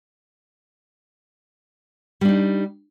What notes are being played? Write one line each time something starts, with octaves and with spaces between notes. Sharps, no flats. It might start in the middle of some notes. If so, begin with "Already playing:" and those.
G3 D4 D#4